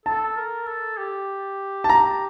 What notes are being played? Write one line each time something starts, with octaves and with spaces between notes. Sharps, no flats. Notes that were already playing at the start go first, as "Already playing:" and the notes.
A4 A5
A#4
A4
G4
A5
A#5